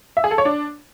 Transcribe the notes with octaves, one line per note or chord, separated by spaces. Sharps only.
E5
G#4
A4
C#5
D4